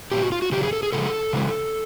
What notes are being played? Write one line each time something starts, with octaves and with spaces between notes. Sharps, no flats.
A#2 F#3 G4
F#4
F4
F#4
C#3 F#3 G4
G#4
A4
G#4
C#3 F3 G#3 A4
C#3 E3 G#3